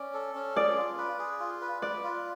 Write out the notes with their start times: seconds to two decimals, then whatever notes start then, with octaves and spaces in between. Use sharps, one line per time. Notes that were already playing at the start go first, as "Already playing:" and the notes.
Already playing: C#4 D5
0.14 A4
0.35 C#4
0.56 G#4 D5
0.77 F4
0.98 B4
1.19 G#4
1.40 F4
1.61 B4
1.82 B4 D5
2.04 F4